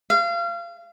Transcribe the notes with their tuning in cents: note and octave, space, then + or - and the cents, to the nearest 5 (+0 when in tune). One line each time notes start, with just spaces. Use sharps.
F5 -30